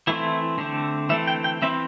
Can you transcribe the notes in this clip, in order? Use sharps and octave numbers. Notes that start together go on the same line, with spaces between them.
E3 A3 C4 E4
D3 A3 C4
E3 A3 C4 E5
G5
G5
E3 C4 E5